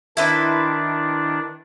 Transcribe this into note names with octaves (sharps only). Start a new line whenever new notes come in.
D#3 D4 E4 B4 C5